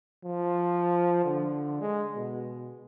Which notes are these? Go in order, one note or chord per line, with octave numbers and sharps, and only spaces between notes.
F3
D3
G#3
B2